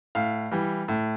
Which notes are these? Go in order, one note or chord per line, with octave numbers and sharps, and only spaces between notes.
A2 F5
E3 G3
A2